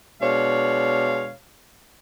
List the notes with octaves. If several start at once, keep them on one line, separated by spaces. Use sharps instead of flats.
B2 G#3 D4 C#5 F5